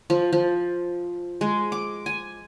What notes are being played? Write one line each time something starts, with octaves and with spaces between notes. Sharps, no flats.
F3
F3
G#3
D6
G#5